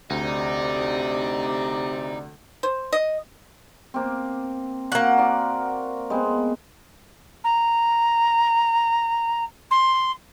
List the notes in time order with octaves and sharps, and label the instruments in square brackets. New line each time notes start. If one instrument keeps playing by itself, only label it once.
[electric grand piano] D2 [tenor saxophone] C3 [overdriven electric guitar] D#4 [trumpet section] D5
[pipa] C5
D#5
[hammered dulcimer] A#3 C4
[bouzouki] A#3 F#5 [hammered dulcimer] F#4
[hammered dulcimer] A#4 D5 C6
G#3 B3 C4
[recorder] A#5
C6